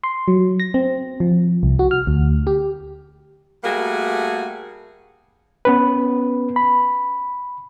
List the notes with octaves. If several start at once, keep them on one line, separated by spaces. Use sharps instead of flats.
C6
F#3
A#6
C4
F3
C2
F#4
F6
D2
G4
G3 A3 A#3 F#4 G#4
B3 C#4 B4
B5